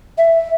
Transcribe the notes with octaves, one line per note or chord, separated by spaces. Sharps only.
E5